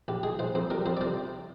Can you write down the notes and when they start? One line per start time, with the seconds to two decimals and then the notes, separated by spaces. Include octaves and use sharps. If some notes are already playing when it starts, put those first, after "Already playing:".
0.08 A#1 G4
0.23 G#3 G#4
0.39 A#1 C5
0.55 F2 C5
0.70 G3 A#4
0.86 F2 C5
0.97 D5
1.01 C3 C5